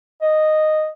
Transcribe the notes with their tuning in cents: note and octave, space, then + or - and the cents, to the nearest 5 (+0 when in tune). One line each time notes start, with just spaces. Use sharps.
D#5 -5